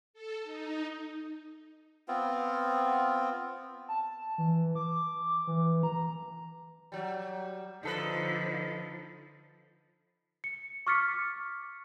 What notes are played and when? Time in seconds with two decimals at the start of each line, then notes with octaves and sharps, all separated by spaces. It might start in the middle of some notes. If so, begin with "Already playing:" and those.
0.14 A4
0.44 D#4
2.08 B3 C4 F4
3.88 A5
4.38 E3
4.75 D6
5.47 E3
5.83 A#5
6.92 F#3 G3
7.83 D3 F3 D#4 A4 B4
10.44 C#7
10.87 C#6 D6 F6 A6 B6 C#7